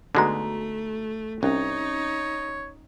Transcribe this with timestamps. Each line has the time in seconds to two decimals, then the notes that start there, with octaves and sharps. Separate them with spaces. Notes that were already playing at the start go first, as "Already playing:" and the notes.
0.15 D3 G#3 A3 B3 D#4 F#4 A#5
1.43 C2 C#4 D#4 C#5